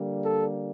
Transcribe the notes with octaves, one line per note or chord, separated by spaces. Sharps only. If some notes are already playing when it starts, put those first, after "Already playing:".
Already playing: D3 G3 A#3
A4